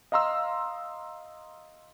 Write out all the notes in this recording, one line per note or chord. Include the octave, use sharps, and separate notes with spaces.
D#5 F5 A#5 C6 E6